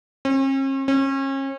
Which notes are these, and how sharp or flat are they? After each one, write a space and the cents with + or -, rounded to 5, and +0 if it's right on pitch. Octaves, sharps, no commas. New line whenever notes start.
C#4 -45
C#4 -35